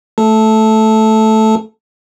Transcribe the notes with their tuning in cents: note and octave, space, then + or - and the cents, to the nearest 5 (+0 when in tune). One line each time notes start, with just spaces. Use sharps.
A3 +0 A4 -15 A5 +0